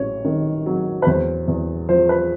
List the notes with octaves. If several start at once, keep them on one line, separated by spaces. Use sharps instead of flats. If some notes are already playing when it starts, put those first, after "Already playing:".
Already playing: A1 F#3 C#5
D#3
F#3
B4
E2 C5
E2
F3 C5
B4